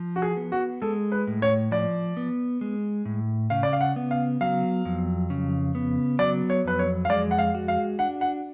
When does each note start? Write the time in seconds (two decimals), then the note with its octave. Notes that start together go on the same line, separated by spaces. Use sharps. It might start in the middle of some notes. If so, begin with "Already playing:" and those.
Already playing: F3
0.16 F#4
0.22 G#4
0.37 B3
0.52 F#4
0.82 G#3 A4
1.12 B4
1.27 A2
1.42 C#5
1.71 F3 D5
2.17 B3
2.61 G#3
3.05 A2
3.50 C#3 F5
3.63 D5
3.73 F5
3.81 F#5
3.96 B3
4.11 F5
4.41 F#3 F5
4.85 F2
5.30 C#3
5.75 B3
6.19 F#3 D5
6.50 C#5
6.65 F2 B4
6.79 C#5
7.05 F5
7.09 G#3 D5
7.31 F#5
7.39 F5
7.55 F#4
7.68 F5
7.99 D4 F#5
8.21 F#5